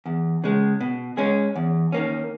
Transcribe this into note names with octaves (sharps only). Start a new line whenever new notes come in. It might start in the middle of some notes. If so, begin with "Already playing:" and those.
E2
C#3 G#3
B2
G#3 C#4 G#4
E2
D#3 A#3 C#4